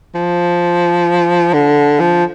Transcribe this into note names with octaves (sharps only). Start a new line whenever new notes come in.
F3
D3
F3